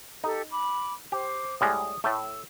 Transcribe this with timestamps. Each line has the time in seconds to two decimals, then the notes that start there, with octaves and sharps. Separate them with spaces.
0.24 D#4 G4 A4
0.50 B5 D6
1.12 G4 C5 D6
1.61 A2 G3 G#3 D#6
2.04 A2 A3 E6